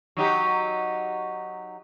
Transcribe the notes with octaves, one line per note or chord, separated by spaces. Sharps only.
F#3 D#4 G4